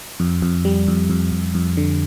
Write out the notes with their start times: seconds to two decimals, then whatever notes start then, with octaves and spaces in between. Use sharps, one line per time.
0.20 F2
0.42 F2
0.65 G3
0.88 F2
1.10 F2
1.32 F2
1.54 F2
1.77 D3